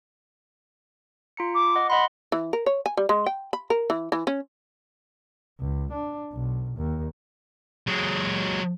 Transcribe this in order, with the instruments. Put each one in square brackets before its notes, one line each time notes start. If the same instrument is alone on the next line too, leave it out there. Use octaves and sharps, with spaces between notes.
[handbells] F4 A#5 C#7
[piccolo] D6
[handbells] D#5 F#5
[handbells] D#5 F#5 C6 [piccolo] B5
[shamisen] E3
A#4
C#5
G#5
G3
G#3
G5
B5
A#4
E3
E3
C#4
[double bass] C#2
D4
B1
D#2
[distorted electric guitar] F#3 G#3